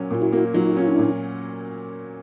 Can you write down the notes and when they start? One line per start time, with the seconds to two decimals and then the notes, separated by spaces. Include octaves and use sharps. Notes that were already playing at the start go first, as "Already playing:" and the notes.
Already playing: A#2 F#3 C#4
0.10 A#2 F4
0.22 E4 F#4
0.32 A#3
0.54 F#3 D#4 F4
0.72 F#4
0.76 C#4 F4
0.87 D4 E4
0.99 A#2